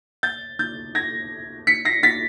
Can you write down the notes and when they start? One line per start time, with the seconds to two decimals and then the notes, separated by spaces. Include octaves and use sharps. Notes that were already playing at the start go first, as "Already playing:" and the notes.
0.23 G6 A6
0.59 G6 A6
0.95 G#6 A#6
1.67 B6 C#7
1.85 A#6 C7
2.03 A6 B6